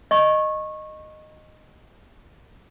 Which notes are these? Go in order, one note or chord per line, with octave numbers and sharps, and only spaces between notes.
D#5 C#6